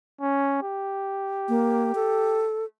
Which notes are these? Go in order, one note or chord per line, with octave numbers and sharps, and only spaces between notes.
C#4
G4
A#3
A4